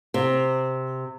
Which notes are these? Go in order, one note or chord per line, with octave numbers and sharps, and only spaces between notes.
C3